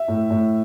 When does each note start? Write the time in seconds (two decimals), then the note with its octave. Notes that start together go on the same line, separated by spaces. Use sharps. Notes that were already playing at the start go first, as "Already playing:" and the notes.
Already playing: E5
0.08 A2
0.30 A2